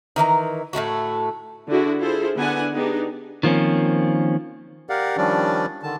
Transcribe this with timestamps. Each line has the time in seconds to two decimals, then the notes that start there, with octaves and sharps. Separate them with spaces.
0.16 D#3 E3 D5 A#5
0.73 A2 C3 A3 F#4
1.68 D3 D4 E4 F#4 G#4
2.00 E4 F4 G#4 A4 C5
2.37 D3 B3 D4 E4 F#5 G#5
2.75 B3 D4 D#4 G4 G#4
3.43 D#3 F3 A#3 C4 C#4
4.89 G4 A#4 D5 F5 F#5
5.17 D#3 F3 G3 C#4 D4 D5
5.83 D3 D#3 A5